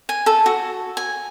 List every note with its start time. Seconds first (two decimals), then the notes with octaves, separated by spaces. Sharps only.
0.09 G#5
0.26 A4
0.46 F#4
0.97 G#5